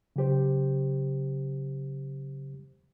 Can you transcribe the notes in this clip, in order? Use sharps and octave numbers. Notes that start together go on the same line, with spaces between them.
C#3 F#3 G4 C5